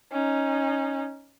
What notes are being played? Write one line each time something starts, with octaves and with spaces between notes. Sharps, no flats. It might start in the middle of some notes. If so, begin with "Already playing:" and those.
C#4 D#4